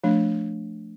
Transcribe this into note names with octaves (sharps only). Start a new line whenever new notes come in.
F3 A3 D4